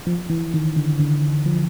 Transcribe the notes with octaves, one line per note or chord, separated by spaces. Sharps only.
F3
E3
D#3
D3
D3
F3